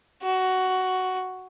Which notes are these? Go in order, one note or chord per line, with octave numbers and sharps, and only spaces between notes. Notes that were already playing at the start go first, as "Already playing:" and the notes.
F#4